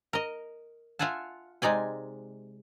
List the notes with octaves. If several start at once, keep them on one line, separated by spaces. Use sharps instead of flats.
A#4 D#5
F4 E5 F#5 G#5 A5
C3 G#3 D#4 D5 G#5